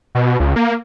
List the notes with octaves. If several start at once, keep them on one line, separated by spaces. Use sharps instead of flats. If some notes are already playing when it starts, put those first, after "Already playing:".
B2
C#2
A#3